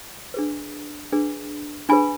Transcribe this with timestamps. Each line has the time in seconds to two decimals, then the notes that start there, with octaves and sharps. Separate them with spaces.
0.34 D4 G#4 B4
1.12 D4 G#4 B4
1.89 D4 G#4 B4 G#5 B5